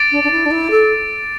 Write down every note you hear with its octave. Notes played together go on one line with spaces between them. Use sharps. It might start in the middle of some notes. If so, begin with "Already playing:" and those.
Already playing: D6 A6 D7
D4
D4
E4
D4
E4
A4